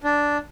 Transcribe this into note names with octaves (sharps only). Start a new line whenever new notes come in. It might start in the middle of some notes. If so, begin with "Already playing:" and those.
D4